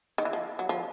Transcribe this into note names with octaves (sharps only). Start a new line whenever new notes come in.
D#3
E3
F3
F#3
F3